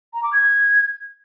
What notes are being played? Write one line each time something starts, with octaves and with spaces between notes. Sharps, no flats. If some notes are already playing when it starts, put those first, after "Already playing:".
A#5
D6
G#6